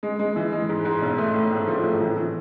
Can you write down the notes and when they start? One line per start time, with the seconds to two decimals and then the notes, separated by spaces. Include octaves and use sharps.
0.03 G#3
0.19 G#3
0.36 E3
0.53 G#3
0.69 G#2
0.85 G#2
1.02 B1
1.18 A3
1.34 A2
1.51 A2
1.68 F3
1.84 A2
2.00 E3
2.16 E3